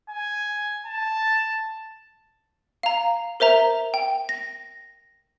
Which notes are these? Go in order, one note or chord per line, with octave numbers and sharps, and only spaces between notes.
G#5
A5
F5 A#5
A#4 C5 E5 A#5
G5
A#6